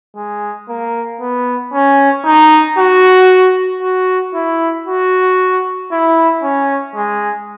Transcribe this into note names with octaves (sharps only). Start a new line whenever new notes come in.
G#3
A#3
B3
C#4
D#4
F#4
F#4
E4
F#4
E4
C#4
G#3